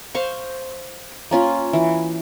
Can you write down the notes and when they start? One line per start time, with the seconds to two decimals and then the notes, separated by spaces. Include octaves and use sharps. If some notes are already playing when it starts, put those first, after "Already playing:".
0.15 C5 F5 C#6
1.31 A#3 C#4 F4
1.73 E3